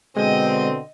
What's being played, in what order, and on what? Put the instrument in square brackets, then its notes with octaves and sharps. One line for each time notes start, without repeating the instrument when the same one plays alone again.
[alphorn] B2 [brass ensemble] D3 C4 [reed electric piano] G#3 [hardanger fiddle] D#5